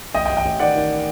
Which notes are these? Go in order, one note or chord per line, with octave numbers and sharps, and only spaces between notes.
A1 D#5 G5
D#5 G5
A1
D#5 G5
A1
D#3 D5 F#5
D#3